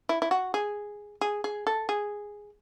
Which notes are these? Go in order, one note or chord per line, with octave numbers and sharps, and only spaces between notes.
E4
E4
F#4
G#4
G#4
G#4
A4
G#4